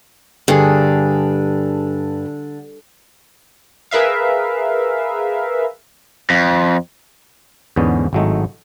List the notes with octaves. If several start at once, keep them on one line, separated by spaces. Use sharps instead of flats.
G2 D3 G#4
G#4 A#4 B4 E5 F5
F2
E2 G#2 D3 B3 C#4
G#1 A2 F#3 G#3 A3 D#4